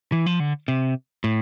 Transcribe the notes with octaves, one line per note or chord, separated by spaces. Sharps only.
E3
F3
D3
C3
A2